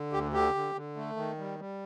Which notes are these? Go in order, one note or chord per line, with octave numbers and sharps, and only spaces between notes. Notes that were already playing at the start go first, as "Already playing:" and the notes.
Already playing: D3
D2 G4
D3 G4
D3
D3
A3
D#3
G3
G3